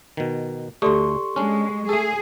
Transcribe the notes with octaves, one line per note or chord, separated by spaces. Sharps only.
B2 D#3
D2 A3 G4 A4 D5 C6 C#6
G#3 C#4 D4 C#6
A3 G#4 A4